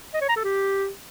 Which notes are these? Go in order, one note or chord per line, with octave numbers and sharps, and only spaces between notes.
D#5
C#5
A#5
A4
G4